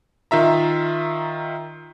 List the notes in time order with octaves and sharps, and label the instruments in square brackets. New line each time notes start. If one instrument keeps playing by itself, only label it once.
[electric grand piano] D#3 F4 E5 A#5